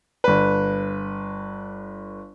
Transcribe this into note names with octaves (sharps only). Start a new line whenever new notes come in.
G1 B4